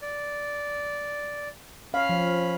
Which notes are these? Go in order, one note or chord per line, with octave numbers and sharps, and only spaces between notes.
D5
C#4 F5 B5
F3